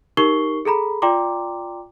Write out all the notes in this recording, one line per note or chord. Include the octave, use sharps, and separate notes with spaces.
D#4 G4 A#4 C#6 C7 G7
G#4 A4 A#5 B5
F4 D5 G5 A#5 C6 D6